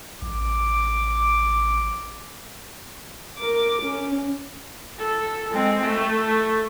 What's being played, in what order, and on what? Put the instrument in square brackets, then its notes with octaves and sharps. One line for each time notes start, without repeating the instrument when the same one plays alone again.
[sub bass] A1 [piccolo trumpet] D6
[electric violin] A#4 D6
C#4
[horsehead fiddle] A4
G#3 C4
A3